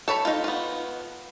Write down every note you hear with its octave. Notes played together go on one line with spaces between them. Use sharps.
A4 C#5 B5
D#4 F4
B3 F4